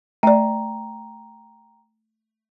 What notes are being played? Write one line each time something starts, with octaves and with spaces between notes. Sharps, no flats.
A3 D5 G5 A#5